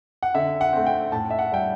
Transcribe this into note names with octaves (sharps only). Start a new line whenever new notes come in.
F#5
D3 E5
F#5
A3 C4
G5
A2 A5
E5
F#5
G3 D4 G5